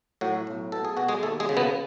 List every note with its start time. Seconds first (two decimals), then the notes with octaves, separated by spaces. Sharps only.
0.21 A2 F#3 F#4
0.47 B1
0.72 B2 A4
0.85 G#4
0.97 B2 F#4
1.08 G#3 G#4
1.23 D#2 A3 A4
1.40 G#3 G#4
1.49 C#3
1.57 B2 B3